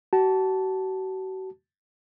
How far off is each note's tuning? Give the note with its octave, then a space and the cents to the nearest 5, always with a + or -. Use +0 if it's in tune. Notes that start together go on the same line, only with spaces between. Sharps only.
F#4 +40 A5 -5